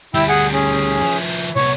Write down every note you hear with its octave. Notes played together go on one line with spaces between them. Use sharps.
D2 G3 E4 G5 E6
G#4 F#5 G#5
C#4 G#4
F3 E4
C2 B3 C#5